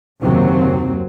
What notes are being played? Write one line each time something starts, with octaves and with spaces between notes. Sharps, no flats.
F#1 D#2 C3 F#3 C4